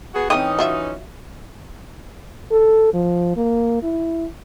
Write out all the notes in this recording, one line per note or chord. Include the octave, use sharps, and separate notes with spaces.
B3 F#4 G#4
E3 C4 C#4 D#4 E5 G5 D#6
F#3 F4 E5
A4
F3
A#3
E4